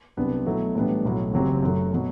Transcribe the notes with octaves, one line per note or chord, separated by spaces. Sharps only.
C2 C3 F#3 B3 D4
B2 F#3 A3 E4
A2 E3 G3 B3 D4
B1 A2 F#3
F#1 F#2 F#3 C4 G4
F#2 F#3 A3
B2 F#3